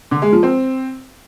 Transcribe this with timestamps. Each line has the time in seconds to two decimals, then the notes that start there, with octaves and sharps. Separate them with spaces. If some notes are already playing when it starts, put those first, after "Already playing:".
0.11 D3
0.22 G#3
0.32 F3
0.43 C4